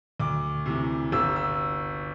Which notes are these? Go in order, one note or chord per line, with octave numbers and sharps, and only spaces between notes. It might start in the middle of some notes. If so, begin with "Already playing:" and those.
D2 D6
C3 E3
G1 E6
E6